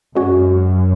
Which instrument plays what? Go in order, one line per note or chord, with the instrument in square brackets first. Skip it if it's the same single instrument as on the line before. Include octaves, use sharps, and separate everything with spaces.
[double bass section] F#2 [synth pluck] G#3 C#4 F#4 C#5